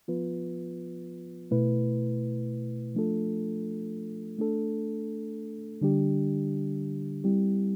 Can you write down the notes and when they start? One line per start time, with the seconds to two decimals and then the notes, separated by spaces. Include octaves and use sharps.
0.08 F3 B3 F4 B4
1.51 B2 A3 E4 B4
2.94 F3 A3 D4 F4 A4
4.39 A3 D4 A4
5.81 D3 G3 D4 G4
7.24 G3 C4 E4 G4